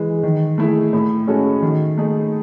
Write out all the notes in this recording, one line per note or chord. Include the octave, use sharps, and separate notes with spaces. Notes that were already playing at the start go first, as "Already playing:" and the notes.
Already playing: E3 G#3
D#3
A3 E4 G#4
A2
G#3 C#4 F#4 A4
D#3
A3 D#4 G#4